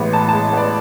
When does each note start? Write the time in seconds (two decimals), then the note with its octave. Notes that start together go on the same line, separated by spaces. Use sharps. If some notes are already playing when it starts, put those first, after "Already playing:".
Already playing: A1 G#3 B3
0.13 A2 A5
0.29 G#3 A5
0.53 B3 D5